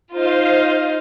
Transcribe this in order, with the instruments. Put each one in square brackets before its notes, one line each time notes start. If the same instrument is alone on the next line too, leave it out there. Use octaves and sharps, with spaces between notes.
[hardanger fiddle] D#4 F4 [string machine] C5 F5